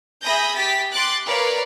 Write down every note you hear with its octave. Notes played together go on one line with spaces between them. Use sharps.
G#4 E5 B5 D#6 G6 A#6
G4 A6 B6
C6 D6 F#6 A6
A#4 B4 C#5 D5 F5